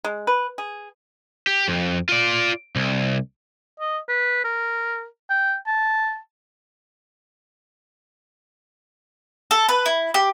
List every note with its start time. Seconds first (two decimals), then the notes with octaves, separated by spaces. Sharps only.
0.04 G#3
0.27 B4
0.58 G#4
1.47 G4
1.68 F2
2.09 F4 D5
2.76 C2
3.80 D#5
4.09 B4
4.44 A#4
5.30 G5
5.67 A5
9.51 A4
9.68 B4
9.86 E4
10.14 G4